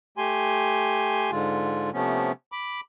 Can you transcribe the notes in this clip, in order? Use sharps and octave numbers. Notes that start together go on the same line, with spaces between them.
A3 G4 G#5 C6
G#2 D3 G#3 F4
C3 F3 A3 B3 C#4
B5 D6